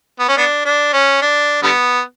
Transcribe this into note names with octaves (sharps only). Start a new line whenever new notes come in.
B3
C#4
B3 D4
D4
C#4
D4
D3 G3 B3